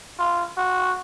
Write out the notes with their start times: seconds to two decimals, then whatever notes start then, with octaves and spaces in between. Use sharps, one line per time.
0.19 F4
0.57 F#4